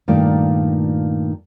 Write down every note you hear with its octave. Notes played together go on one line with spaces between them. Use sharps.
G2 A#2 D#3 A3 F4 D5